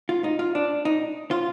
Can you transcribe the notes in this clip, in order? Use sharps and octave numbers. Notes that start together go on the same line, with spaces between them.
F4
D#4
F4
D4
D#4
F4